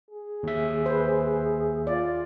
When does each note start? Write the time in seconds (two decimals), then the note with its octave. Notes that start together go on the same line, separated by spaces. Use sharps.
0.11 G#4
0.43 D#2 E5
0.86 B4 C5
1.87 F4 D5